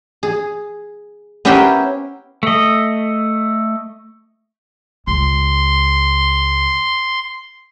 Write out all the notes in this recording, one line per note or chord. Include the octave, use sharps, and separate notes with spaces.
G#4
B3 C#4 E4 G4 A#4 C5
A3 D#5
C#2 C6